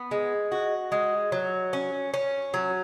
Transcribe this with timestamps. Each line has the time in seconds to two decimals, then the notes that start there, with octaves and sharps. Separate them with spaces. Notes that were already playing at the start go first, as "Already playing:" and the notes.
Already playing: B3
0.11 G#3
0.52 F#4
0.92 G#3
1.32 F#3
1.73 C#4
2.14 C#4
2.54 F#3